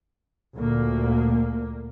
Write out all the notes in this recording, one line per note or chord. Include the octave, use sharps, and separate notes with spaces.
D2 A#2 A#3